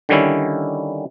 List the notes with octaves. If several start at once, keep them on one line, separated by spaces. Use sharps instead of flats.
D3 D#3 G3 C#4 E4